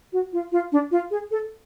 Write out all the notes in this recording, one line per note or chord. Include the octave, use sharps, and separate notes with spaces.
F#4
F4
F4
D4
F4
G#4
A4